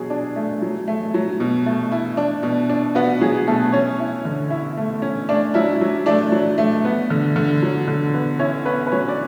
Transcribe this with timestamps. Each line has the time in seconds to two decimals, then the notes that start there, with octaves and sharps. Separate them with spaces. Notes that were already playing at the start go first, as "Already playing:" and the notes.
Already playing: B2 F#3 G#4
0.10 D4
0.36 A3
0.62 F#3
0.88 A3
1.14 F#3
1.40 B2
1.66 A3
1.92 E4
2.17 D4
2.43 B2
2.70 D4
2.95 B3 F#4
3.21 F#3 G#4
3.47 B2 A3 A4
3.72 C#4 C#5
4.00 E4
4.25 D3
4.50 E4
4.77 A3
5.02 C#4
5.29 A3 D4 D5
5.54 F#3 E4 E5
5.81 F#3
6.06 A3 D4 D5
6.32 F#3
6.58 A3
6.85 B3
7.10 D3
7.36 D3
7.62 F#3
7.88 D3
8.14 B3
8.39 C#4 E4 C#5
8.65 B3 C#4 B4
8.87 B4
8.92 F#3 C#4 C#5
9.08 D5